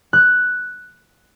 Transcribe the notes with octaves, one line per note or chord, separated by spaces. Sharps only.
F#6